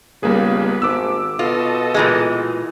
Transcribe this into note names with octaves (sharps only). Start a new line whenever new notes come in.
C#2 G3 A#3 B3 G#4
G#1 D6 E6
B2 F4 A4 D#5
A#2 E3 G#3